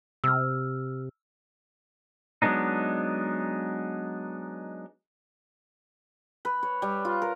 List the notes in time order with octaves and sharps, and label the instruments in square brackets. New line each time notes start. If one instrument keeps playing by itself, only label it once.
[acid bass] C3 [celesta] E6 F6
[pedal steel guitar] F#3 G#3 B3 D4 D#4
[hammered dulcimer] B4
C#5
G3
F4
A#4